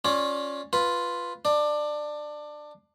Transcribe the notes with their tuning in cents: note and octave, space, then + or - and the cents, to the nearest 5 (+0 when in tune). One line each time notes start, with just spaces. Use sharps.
C#4 +0 F4 +20 D5 +0
F4 +0 B4 +0
D4 +20 D5 +20